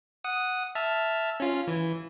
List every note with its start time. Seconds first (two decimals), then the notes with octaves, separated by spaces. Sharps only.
0.24 F#5 D#6
0.75 E5 A5 F6
1.40 C#4 F4
1.67 E3